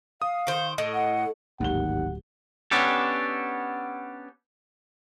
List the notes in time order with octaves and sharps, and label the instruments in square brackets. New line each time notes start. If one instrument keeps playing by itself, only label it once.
[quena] F5 [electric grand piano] D#6
[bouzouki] D#3 C5
[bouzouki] A2 [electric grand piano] D#5
[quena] F#5
[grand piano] D1 G4 G7 [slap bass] G#1 G#2 [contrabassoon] D#2 [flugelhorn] F#5
[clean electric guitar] B3 C#4 D4 G4 A4